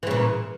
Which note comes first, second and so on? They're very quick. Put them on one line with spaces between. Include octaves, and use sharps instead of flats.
E3 C#3 A#2